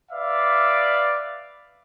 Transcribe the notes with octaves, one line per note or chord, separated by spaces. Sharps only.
B4 D5 E5 F5